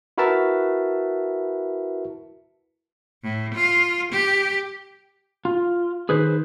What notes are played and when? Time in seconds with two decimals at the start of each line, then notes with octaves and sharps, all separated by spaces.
0.18 E4 F#4 A#4 B4 E5 A5
3.23 A2
3.55 F4
4.12 G4
5.45 F4
6.09 D#3 G#4 B4 C5